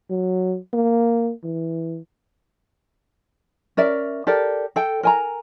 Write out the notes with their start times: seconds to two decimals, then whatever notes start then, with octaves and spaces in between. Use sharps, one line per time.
0.10 F#3
0.73 A#3
1.44 E3
3.77 C#4 A#4 D5 E5
4.27 G4 A4 A#4 D5
4.76 A4 G5
5.03 A#4 G#5 A#5